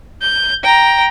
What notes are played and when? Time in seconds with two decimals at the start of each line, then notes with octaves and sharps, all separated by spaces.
0.22 G6
0.64 G5 A#5